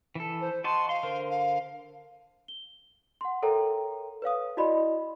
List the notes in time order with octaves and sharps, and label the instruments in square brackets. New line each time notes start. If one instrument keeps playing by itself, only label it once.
[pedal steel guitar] E3 A4
[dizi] C5
[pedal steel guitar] F#4 D#5 A5 [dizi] C6
[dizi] F5 [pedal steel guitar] C6
[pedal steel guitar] D3 A#4 C5
[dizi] F5
[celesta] G7
F#5 C6
A4 A#4 C#5 E5 G5 A#5
B4 C#5 F5 D#6
E4 F#4 D5 D#5 B5 C6